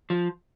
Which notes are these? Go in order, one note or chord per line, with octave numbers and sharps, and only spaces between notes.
F3